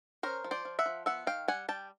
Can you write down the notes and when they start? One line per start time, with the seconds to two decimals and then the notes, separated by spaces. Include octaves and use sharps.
0.23 C#4 A#4 C5
0.44 F3
0.51 C5 D5
0.65 F3
0.79 E5 F#5
0.86 F3
1.06 B3 E5 F#5
1.27 D#3 F5 G5
1.48 G3 F#5 G#5
1.68 G3 G5 A5